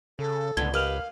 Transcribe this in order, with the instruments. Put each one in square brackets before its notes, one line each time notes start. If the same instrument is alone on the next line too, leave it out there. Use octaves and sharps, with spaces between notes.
[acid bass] C#3 [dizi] A4
[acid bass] C#2 [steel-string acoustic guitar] A2 D3 B3 [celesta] G#6 G7
[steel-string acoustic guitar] G4 B4 D#5 [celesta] A#4 F6 F7 [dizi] F5